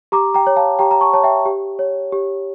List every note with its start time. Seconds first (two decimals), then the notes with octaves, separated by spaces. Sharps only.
0.12 G4 A#5 D6
0.34 G5 A#5
0.47 C#5
0.57 F5 A5
0.79 G4 G5 A#5
0.91 A#5
1.01 A5 C#6
1.13 C#5 A5
1.24 E5 G5
1.46 G4
1.79 C#5
2.12 G4